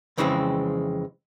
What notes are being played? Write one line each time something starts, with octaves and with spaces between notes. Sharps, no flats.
F2 C#3 E3 G#3 B3 C4